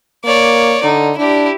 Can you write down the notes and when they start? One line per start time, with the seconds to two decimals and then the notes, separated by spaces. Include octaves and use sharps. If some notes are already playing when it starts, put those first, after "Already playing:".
0.24 A#3 C#5 D5
0.83 D3 D#4
1.17 D4 E4 G4